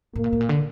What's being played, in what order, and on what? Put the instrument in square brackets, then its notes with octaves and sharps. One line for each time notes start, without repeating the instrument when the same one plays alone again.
[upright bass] A2 [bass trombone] A#3
[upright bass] A#2
A2
A#2
D3